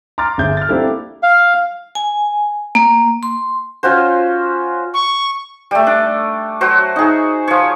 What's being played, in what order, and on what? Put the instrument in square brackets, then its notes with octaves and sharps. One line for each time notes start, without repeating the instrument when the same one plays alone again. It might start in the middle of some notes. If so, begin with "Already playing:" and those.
[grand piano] A#5 C6 D6 F6 A6
G1 D3 G#4 E5 G6
F6 A6
A#3 C4 D4 E4 G4 A4
[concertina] F5
[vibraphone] G#5
A#3
C6
[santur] C#4 F4 F#4 C5
[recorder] C#6
[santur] G3 A3
D4
F#3 F#4 C5
D#4 G#4
F3 C#5